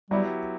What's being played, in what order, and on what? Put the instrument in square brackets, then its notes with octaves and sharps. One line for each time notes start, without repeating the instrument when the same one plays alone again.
[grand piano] F#3 B3 E4 G4 [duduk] G3